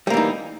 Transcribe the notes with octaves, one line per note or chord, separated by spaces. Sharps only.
E3 G3 A#3 D#4